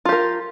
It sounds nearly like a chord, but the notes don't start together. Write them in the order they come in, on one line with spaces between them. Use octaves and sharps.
F4 G4 A#4